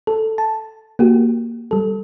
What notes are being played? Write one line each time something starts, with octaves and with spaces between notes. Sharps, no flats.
A4
A5
A#3 F#4 G4
G3 A4